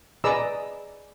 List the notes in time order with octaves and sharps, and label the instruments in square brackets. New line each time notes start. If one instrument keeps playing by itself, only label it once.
[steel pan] G#4 B4 D5 D#5 A#5 E6